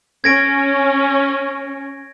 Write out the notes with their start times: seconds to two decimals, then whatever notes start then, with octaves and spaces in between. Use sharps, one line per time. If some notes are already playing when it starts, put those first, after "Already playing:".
0.24 C#4 G#6 A#6 D7